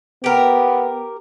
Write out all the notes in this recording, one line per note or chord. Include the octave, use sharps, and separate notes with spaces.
B3 G4 A#4